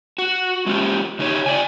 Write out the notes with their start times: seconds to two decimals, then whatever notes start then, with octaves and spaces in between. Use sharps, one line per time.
0.18 F#4
0.66 G#3 A3 C#4 F4 G4
1.19 C#3 D#4 G4 C#5
1.46 D5 G5 G#5